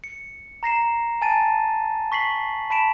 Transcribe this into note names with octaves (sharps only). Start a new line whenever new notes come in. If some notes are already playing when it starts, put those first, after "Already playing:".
C#7
A#5 A#6 C7 E7
G#5 A5 A6 D#7
C#6 B6 C7 F#7
A5 B5 B6 D7 E7